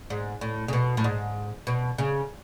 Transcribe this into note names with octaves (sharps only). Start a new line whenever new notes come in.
G#2
A2
C#3
B2
A2
G#2
B2
C#3